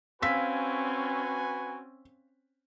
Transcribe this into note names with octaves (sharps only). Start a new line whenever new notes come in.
C4 C#4 F#4 B4 F5 G#5 E6 B6